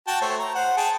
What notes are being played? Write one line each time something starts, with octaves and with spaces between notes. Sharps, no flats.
F#4 G5 A5
A3 C5 C#5
A#5
C5 F#5
G#4 G5 A5